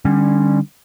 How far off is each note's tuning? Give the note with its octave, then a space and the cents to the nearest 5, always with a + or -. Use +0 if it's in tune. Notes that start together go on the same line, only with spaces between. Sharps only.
D3 +30 G3 +20 C#4 +0